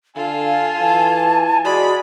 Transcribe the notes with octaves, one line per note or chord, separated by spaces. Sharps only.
D3 F4 A4 F5 G#5
E3 A5
G#3 F#4 D5 B5